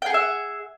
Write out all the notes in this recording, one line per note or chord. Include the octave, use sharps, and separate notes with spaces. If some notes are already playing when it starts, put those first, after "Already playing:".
G#4 E5 F#5 G5